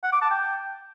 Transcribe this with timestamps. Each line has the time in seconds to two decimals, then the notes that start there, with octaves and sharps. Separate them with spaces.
0.03 F#5
0.13 D6
0.22 A5
0.31 G5